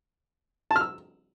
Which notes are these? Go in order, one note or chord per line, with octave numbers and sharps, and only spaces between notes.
A5
F6
E6